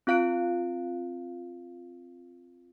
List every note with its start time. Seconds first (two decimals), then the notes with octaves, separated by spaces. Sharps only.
0.07 C4 F4 F5 F#6 D7